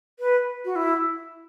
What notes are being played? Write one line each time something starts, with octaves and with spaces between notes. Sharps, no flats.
B4
F#4
E4